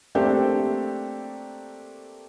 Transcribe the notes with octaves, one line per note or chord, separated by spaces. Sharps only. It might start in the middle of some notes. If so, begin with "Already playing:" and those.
A3 A#3 C4 D4 G4 A4